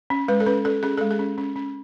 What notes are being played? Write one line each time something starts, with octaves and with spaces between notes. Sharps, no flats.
C#4
G#3 B4
A4
C#4 B4
C#4 A4
C#4 G#4
G#3 A4
G#4
C#4
C#4
C#4